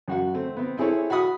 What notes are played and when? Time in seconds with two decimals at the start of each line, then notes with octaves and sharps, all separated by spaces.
0.08 F#2 F#4 F#5
0.34 A3 C4
0.57 B3 C4
0.77 C4 E4 G#4 A4 C#5
1.10 F#4 F#5 B5 D#6